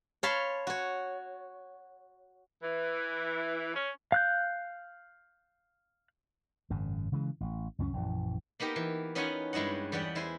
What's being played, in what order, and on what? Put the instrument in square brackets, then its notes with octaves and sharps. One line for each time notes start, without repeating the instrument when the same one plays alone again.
[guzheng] C#5 F5 A5 B5 C6
F#4 C#5
[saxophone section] E3
C#4
[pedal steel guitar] F5 F#6 G6
[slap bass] G#1 F#2 C#3
C#3 E3 G#3
A1
C#2 F#2 C4 C#4
A#1 F#2 E3
[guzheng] A#3 B3 D#4 G4 A#4
E3
B3 C#4 D#4 F4 F#5 G#5
G2 G#3 E4 D#5 F#5
E2 G3 B3 F#5 G5
G#3 E4 C5 G#5